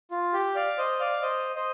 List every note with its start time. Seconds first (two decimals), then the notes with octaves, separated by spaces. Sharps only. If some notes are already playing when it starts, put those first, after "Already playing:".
0.11 F4
0.33 G4
0.55 D5 F5
0.78 C5 D#5
1.00 D5 F5
1.22 C5 D#5
1.56 C5 D#5